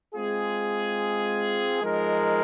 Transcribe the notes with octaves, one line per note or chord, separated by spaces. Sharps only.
G#3 C4 F4 G#4
F3 G#3 D#4 A#4